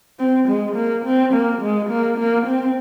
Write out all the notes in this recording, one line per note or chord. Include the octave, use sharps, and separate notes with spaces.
C4
G#3
A#3
C4
A#3
G#3
A#3
A#3
C4